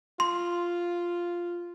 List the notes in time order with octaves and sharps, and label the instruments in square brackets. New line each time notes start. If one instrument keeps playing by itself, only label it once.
[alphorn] F4 [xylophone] C6